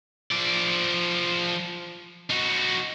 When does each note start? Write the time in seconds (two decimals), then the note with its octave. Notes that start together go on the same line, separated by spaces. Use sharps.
0.32 F3 D5
2.31 D#4 F#4